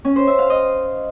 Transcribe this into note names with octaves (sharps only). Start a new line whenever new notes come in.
C#4
C5
E5
F5
D#5